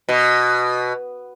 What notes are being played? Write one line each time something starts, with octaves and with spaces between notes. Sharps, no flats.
B2